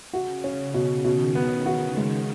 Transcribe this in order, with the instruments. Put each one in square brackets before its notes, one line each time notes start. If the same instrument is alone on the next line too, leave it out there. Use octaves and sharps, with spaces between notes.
[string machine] C#3 [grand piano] F#4
[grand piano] C#4
B2
[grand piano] B2 [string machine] D#3
[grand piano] B3
F#4
G#3